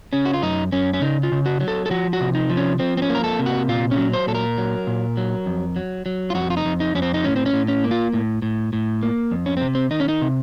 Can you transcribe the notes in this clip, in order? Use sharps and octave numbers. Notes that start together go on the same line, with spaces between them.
C#3 C#4
F#4
F4
F#2 D#4
F#2 C#4
C#4
C#3 D#4
F4
C#3
F#4
F#3
A4
A4
F3 F#4
F#4
C3
D#4
F3
C#4
F3 C4
C4
C#4
A#3
A#4
A4
C3
F#4
A#2 F4
C#4
F#3
C5
A#2 A4
A#4
F#3
A#2
F#3
F2
F#3
F#3
F4
F2 F#4
F4
D#4
F2
D#4
F2 C#4
C4
D#4
A2 C#4
C4
C#4
A2
C#4
A#3
F4
A2
A2
A2
A#3
F2
C#4
C3 C4
C4
D#3 D#4
C#4
D#4
C3